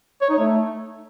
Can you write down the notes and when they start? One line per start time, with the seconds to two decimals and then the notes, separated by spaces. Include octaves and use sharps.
0.21 C#5
0.30 D#4
0.39 A3